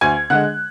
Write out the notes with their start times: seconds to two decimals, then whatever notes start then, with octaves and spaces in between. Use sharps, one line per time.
0.01 D2 G#5 G#6
0.30 D3 G#3 F#5 F#6